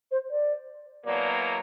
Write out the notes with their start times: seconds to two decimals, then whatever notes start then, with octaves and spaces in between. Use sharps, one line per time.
0.11 C5
0.30 D5
1.05 E2 B2 F#3 A#3 D5